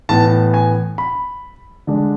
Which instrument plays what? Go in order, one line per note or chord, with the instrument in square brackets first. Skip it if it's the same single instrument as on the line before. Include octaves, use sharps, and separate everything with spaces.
[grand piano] A2 E3 B3 A5
G#5
B5
D3 G#3 D4